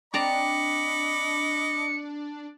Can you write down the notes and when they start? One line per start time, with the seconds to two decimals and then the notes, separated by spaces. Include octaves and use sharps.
0.14 C4 D4 D5 D#5 A#5 B5 D6 C#7